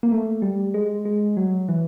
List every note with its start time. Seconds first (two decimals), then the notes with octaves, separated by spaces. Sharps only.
0.03 A#3
0.12 A3
0.42 G3
0.74 G#3
1.05 G#3
1.37 F#3
1.69 E3